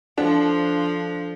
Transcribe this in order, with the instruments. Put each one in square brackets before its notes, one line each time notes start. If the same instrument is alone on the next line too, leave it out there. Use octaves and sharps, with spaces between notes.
[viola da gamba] F3 [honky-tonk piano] D4 [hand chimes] A4 C5